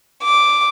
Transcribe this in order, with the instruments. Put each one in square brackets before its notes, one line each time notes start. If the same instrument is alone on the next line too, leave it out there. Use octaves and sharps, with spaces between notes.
[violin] D6